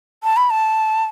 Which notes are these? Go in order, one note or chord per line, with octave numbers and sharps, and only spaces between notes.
A5
B5
A5